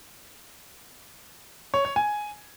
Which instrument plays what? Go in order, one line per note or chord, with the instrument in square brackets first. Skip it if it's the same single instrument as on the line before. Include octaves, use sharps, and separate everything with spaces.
[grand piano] C#5
C#5
G#5